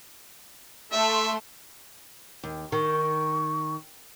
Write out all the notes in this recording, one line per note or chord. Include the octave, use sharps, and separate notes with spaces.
A3 E5 C6
D#2
D#3 C#6